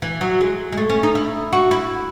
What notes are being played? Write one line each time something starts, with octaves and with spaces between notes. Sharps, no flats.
E3
F#3
G#3
G#3
A3
C#4
D#4
E4
F#4
E4